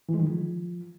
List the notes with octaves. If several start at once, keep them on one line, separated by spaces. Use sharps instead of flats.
E3
G#3
D#3
F3